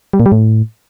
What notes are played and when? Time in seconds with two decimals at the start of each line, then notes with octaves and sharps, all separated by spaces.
0.13 G3
0.20 A#2
0.26 G3
0.32 A2